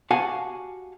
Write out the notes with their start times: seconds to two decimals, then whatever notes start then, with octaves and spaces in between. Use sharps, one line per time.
0.11 F#4 G4 F5 F#5 G#5 A5